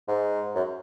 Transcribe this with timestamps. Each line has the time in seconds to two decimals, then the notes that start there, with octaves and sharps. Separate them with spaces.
0.08 G#2
0.55 F#2